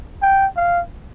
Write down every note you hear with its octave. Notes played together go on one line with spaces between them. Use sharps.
G5
F5